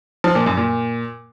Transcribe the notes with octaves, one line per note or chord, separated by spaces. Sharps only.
F3
A#2
F#2
A#2